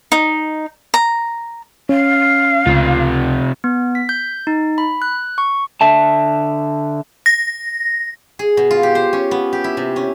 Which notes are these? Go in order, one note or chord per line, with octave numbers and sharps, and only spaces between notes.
D#4
A#5
C#4 F5
C#2 C3 F4
B3
B6
G6
D#4
B5
F#6
C#6
D3 E5 A5
A#6
G#4
B2
F4
G4
C5
C#4
B3
G4
E4
C3
C#4